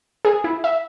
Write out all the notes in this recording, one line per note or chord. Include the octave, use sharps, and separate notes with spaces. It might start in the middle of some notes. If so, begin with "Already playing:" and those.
G#4
E4
E5